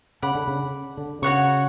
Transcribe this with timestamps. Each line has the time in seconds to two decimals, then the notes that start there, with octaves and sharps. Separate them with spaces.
0.22 C#3 D5 F#5 B5
0.35 D3
0.47 C#3
0.98 D3
1.22 C#3 F#4 C#5 F#5 C#6